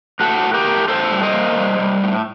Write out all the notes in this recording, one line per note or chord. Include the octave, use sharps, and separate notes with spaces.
A2 F#4 A4
A2
G4 A#4
A2
A2 A4 C5
G3
C5 D#5
A#3
G3
G3
A2